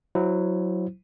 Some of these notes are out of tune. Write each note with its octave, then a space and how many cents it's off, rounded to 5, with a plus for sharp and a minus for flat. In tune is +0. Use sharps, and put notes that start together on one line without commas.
F#3 +0 E4 +10 C5 -10